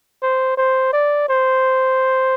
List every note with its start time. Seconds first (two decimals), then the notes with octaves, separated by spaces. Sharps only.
0.22 C5
0.57 C5
0.93 D5
1.29 C5